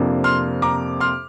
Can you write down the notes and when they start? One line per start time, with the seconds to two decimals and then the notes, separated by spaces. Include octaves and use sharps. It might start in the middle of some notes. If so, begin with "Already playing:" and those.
Already playing: F2 C3 A#3 D4
0.24 C6 F6
0.62 A#5 D6
1.00 C6 F6